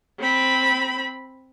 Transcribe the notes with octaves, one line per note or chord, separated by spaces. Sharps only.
C4 B5